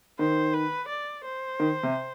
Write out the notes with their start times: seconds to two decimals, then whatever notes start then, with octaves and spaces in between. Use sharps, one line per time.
0.19 D#3 C5
0.54 B4
0.89 D5
1.25 C5
1.60 D#3
1.83 C3